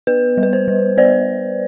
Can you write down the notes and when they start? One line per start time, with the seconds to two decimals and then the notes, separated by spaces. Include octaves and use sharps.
0.07 B3 B4
0.38 G3
0.43 B4
0.53 C5
0.68 G3
0.97 B3 C5 D5